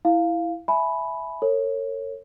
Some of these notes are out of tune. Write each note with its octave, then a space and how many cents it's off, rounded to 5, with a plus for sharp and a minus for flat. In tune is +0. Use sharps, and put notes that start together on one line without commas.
E4 +0 F5 -5
E5 +0 G#5 +30 B5 +0
A#4 -45 C#5 -20